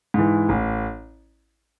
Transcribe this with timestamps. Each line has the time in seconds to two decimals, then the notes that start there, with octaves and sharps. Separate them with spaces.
0.14 G#2 E3
0.49 A1